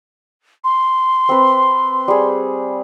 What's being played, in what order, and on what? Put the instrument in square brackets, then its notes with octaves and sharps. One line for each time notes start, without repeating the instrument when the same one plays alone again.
[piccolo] C6
[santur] C4 B4
G3 G#4